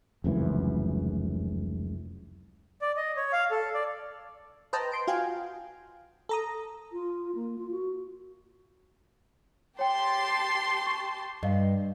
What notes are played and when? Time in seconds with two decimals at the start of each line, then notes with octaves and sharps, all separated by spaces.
0.24 F1 C#2 F#2 E3
2.82 D5
2.96 D#5
3.16 C#5
3.33 F5
3.51 A4
3.74 D5
4.73 B4 C5 D#5 G5 A5 A#5
4.92 C6 D7
5.07 F4 F#4 F5 G5 G#5
6.29 A4 A#5 D#6
6.92 F4
7.35 A#3
7.59 F4
7.71 F#4
9.79 G4 C#5 G5 A5 C6
10.86 C#6
11.43 G2 D#5 F5